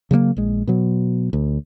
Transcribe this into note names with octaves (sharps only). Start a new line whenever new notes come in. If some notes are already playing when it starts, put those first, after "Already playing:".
C#3 F#3 G3 A#3
A#1 G#3
B2 F#3
D2